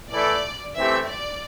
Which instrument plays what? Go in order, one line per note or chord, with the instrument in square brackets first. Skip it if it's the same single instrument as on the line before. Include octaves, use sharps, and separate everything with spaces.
[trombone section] E3 A3 E4 A4 [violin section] D5
[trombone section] E3 A3 C4 G4 [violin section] E5
[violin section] D5